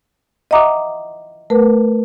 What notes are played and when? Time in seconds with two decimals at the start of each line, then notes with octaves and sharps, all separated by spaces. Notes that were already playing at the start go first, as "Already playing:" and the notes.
0.51 D#5 E5 F#5 A#5 D6 D#6
1.50 A3 A#4 B4